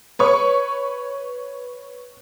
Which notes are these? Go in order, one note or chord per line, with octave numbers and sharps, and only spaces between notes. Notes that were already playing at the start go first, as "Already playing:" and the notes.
B4 C#5 C#6